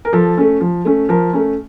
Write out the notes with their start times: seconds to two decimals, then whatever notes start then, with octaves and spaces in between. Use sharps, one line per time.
0.05 A#4
0.13 F3 A4
0.37 A3 C#4
0.61 F3
0.85 A3 C#4
1.09 F3 A#4
1.33 A3 C#4